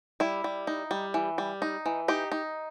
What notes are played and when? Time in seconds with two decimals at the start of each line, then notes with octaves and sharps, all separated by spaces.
0.20 G3 E4
0.44 G3
0.67 D#4
0.91 G3
1.14 E3
1.38 G3
1.62 D#4
1.86 E3
2.08 D#4 G4
2.32 D#4